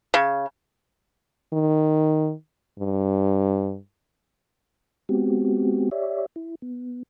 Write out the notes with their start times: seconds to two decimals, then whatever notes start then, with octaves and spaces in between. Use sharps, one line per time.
0.14 C#3
1.53 D#3
2.79 G2
5.09 G#3 B3 C4 F#4 G4
5.91 G4 C#5 D5 E5
6.36 E4
6.62 B3